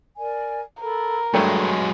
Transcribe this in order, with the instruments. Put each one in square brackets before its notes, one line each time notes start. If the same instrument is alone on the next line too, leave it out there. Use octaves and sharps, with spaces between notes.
[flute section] A#4 D5 G#5
[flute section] A4 B5 [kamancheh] A#4
[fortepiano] G2 A3 [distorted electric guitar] F#3 G#3 [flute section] B4